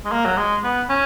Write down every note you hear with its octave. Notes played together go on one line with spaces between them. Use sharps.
G#3
A#3
F#3
G#3
B3
C#4